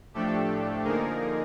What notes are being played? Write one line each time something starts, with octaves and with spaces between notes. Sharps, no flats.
A2 F3 A3 D4 G4 A4
D3 F3 A#3 D#4 G#4 A#4